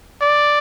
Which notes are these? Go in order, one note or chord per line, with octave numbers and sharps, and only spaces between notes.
D5